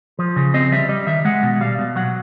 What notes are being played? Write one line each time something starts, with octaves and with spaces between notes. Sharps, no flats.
F3
C#3
C4 D#5
G3 E5
G3 D#5
D#3 E5
G#3 F#5
B2
G3 F5
B2
F#3 F#5